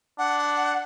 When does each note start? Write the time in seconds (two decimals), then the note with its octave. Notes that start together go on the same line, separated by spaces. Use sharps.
0.18 D4 F#5